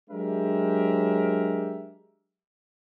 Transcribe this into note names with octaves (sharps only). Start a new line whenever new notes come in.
F#3 G#3 D4 G4 A#4 E5